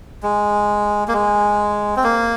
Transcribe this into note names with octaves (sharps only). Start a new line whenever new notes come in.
G#3
A#3
G#3
C4
A#3